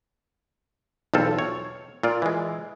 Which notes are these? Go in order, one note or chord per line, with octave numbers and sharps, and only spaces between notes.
B1 E2 C4 F4 A4
C#5
A#2 F4 D5
E3 G#3